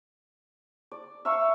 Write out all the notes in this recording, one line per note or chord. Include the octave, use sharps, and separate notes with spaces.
D5
E5 F5 A#5 C#6